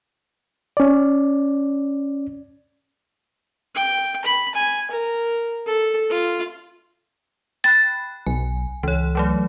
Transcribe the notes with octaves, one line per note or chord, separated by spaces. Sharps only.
C#4 D5
G5
B5
G#5
A#4
A4
F4
G5 B5 F#6 A6
B1 G#5
C#2 E3 C#5
E3 F#3 A3